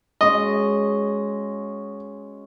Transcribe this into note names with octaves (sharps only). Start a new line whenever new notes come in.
G#3 C#4 F#4 D#5